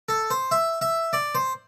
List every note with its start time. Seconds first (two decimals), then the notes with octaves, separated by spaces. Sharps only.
0.09 A4
0.30 C5
0.51 E5
0.81 E5
1.13 D5
1.35 C5